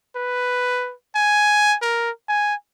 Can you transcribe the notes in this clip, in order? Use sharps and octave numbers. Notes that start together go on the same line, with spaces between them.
B4
G#5
A#4
G#5